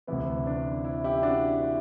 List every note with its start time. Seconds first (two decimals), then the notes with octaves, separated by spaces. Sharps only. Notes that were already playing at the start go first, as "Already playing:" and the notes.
0.07 D2 C3 E3 B3 E4
0.47 D4
0.85 E4
1.04 E4 G4
1.23 D4 F#4
1.62 E4